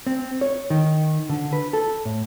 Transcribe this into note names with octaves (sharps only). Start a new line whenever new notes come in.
C4
C#5
D#3
D3
B4
A4
A2